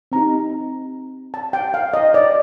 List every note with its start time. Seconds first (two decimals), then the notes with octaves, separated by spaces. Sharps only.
0.12 C4 D#4 G4 A#5
1.34 A5
1.53 G5
1.74 F5
1.94 D#5
2.14 D5